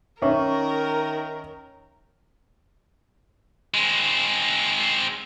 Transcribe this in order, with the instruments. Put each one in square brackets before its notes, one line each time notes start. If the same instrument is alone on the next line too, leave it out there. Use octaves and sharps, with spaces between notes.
[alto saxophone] D#3 [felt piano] C#4 E5 C#6 [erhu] A#4
[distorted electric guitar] G#3 C4